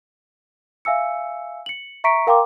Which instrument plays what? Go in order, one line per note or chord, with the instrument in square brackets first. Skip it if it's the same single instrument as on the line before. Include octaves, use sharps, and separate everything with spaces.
[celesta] E5 F5 G#5 E6 C#7
C#7 F#7
E5 A#5 C#6 B6 C#7 D7
A#4 F5 G5 A#5 C6 D6